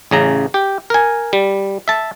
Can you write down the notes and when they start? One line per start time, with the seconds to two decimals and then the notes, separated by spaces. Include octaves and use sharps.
0.11 A1 C#3 A#5
0.54 G4
0.90 A#4 G#5
1.33 G3
1.88 E5 A5